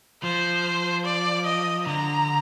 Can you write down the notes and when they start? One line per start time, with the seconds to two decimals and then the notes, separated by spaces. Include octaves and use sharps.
0.23 F3 C5
1.05 D5
1.46 D#5
1.87 D3 A#5